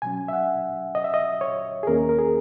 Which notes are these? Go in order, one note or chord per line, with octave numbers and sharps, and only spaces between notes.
B2 F#3 C#4 G#5
E5
F#5
D#5
E5
D#5
C#5
G#4
D#2 D#3 A#3 C#4 A#4
A#4
G#4